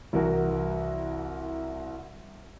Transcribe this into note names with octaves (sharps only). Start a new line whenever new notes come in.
C2 E3 F#4 A#4